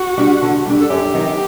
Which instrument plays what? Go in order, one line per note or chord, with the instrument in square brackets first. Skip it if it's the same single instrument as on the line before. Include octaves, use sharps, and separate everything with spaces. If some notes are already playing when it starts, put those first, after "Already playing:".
Already playing: [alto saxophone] F#4
[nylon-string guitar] G3 D4
D3
G3 D4
[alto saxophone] A4
[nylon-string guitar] F#2 [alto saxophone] G4
[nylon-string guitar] D#3 F#3 C4 D#4